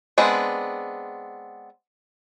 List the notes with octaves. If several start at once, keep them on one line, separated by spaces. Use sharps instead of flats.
G#3 B3 C4 D4